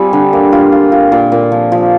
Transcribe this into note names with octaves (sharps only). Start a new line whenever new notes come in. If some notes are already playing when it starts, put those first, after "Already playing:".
Already playing: G3 C4 F4 G#4
D3
A#3
F4
F4
F4
A#2
A#2
F3
F3